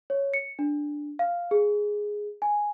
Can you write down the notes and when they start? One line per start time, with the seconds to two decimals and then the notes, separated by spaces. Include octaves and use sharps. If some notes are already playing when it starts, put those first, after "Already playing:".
0.10 C#5
0.34 C#7
0.59 D4
1.19 F5
1.51 G#4
2.42 G#5